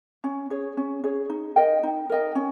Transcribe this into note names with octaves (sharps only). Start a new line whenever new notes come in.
C#4
G#4 C#5
C#4
G#4 C#5
D#4
A#4 D#5 G5
D#4
A#4 D#5 G5
C#4